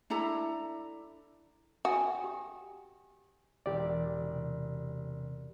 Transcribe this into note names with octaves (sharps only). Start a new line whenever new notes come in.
D4 E4 A4 A#5
F#4 G5 G#5 D#6
G4
E1 E3 G4 D5
C3